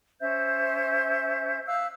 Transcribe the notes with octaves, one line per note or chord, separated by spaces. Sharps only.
C#4 C5 E5 G6
E5 F5 E6 F#6